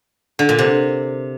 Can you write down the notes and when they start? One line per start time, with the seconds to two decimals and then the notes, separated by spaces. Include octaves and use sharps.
0.39 D3
0.49 A#2
0.59 C3